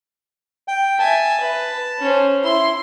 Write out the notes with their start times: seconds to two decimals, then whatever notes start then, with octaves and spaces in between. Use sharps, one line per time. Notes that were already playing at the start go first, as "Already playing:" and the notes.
0.68 G5
0.99 E5 G#5 A5
1.40 B4
1.99 C#4 C5
2.44 E4 C6